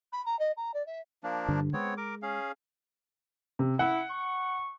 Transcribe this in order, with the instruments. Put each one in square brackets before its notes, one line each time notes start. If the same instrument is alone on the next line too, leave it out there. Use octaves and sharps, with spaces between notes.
[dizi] B5
A#5
D#5
A#5
D5
E5
[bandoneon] F3 A#3 D4
[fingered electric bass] G2 D3
[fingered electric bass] G#3 [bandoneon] B3 C4 C#5
[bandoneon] A#4 D6
C#4 G#4 F5
[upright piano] C3
[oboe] E4 [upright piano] F#5
[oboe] C#6